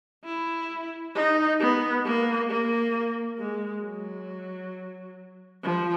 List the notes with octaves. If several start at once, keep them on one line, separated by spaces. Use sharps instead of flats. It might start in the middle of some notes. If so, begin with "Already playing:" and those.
E4
D#4
B3
A#3
A#3
G#3
F#3
F3